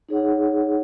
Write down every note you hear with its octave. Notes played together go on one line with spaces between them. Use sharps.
D#4 G#4 C#5 F#5